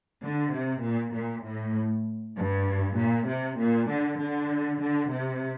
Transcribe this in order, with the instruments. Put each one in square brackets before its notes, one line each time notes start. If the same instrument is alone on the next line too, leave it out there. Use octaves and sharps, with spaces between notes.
[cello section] D3
C3
A#2
A#2
A2
G2
A#2
C3
A#2
D3
D3
D3
C3